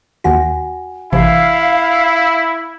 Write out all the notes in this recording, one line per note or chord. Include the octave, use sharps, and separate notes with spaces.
D#2 D#3 F#4 F#5 G#5 A#6
A1 C3 E3 E4 F5